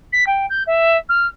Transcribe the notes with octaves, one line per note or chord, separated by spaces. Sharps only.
B6
G5
G6
E5
F6